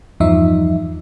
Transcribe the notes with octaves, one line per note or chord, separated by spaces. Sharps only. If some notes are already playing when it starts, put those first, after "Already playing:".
E2 G2 F3 D#4 E5